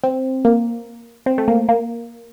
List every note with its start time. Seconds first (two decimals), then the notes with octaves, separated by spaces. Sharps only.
0.04 C4
0.45 A#3
1.26 C4
1.38 A3
1.48 A#3
1.69 A#3